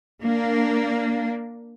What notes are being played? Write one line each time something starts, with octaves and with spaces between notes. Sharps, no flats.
A#3 D4